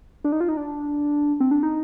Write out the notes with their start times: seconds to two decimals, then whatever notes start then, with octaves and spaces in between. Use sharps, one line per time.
0.24 D4
0.32 D#4
0.40 F4
0.49 D#4
0.57 D4
1.40 C4
1.51 D4
1.63 D#4